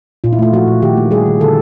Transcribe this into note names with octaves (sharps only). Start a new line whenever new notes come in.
A#2 F4
E4
A3 F4
F3 F#4
A#2
D#3 G4
A#3
G3 G#4
D#3
D3 A4